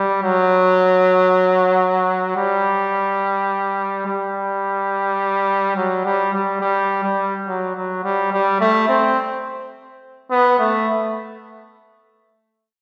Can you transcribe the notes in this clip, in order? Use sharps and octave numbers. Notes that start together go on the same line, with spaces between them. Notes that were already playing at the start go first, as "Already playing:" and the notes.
Already playing: G3
F#3
G3
G3
F#3
G3
G3
G3
G3
F#3
F#3
G3
G3
A3
C4
B3
A3